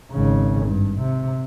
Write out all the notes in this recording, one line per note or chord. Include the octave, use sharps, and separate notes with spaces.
G#1 C#3
G2
C3